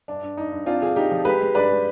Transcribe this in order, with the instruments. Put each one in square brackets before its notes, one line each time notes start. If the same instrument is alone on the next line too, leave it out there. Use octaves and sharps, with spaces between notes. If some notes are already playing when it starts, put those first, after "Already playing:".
[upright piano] G2 D4
G2
G2 D#4
G2
C4 D4 F4
D3 F4 G#4
D3 D#4 G4
F3
G#3 G4 B4
G#3
G2 B4 D5
G#3